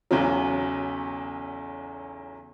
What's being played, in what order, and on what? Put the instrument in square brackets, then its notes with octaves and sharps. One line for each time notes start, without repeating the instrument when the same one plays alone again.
[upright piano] B1 E2 C#3 F#3